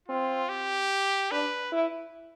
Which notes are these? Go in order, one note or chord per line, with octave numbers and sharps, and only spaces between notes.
C4 F4
G4
D4 B4
E4